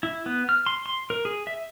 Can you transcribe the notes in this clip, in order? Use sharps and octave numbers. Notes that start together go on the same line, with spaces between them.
E4
B3
F6
C6
C6
A#4
G#4
E5